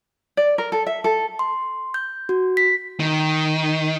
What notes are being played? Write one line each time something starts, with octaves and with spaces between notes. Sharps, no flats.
D5
A#4
A4
E5
A4
C6
G6
F#4
B6
D#3